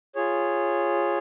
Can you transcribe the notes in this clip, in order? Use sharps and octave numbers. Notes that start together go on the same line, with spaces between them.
F4 G#4 C#5